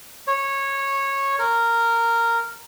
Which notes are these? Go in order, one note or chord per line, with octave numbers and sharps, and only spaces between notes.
C#5
A#4